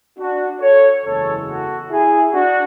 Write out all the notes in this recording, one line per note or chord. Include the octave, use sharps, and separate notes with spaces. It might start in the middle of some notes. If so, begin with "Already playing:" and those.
D4 F#4
A4 C#5
F#1 E2 C#3 E3 G#3 A4 C#5
F#4 A4
E4 G#4
D4 F#4